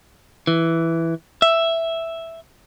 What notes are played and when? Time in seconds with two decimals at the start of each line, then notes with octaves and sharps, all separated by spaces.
0.47 E3
1.42 E5